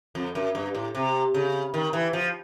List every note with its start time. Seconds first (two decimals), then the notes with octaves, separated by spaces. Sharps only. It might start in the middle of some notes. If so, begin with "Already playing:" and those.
0.15 F2
0.35 F#2
0.55 G2
0.75 A2
0.95 C3
1.34 C#3
1.74 D#3
1.93 E3
2.13 F3